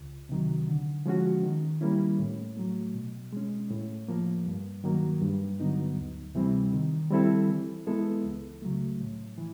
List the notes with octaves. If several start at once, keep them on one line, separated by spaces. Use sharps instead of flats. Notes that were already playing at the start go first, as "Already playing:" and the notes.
Already playing: C#2
C3 D#3 F#3
D3
F3 G#3 C#4 F#4
D#3
G3 A#3 C#4 E4
A2
F#3 A3
B2
G#3 C#4
A2
F3 A#3
G2
D#3 F#3 A#3
G2
D3 F#3 B3 D#4
D2
C3 E3 G3 C4
D#3
G3 C4 E4 A4
E3
G#3 B3 E4 A4
C#2
C#3 F#3 A3
A2
E3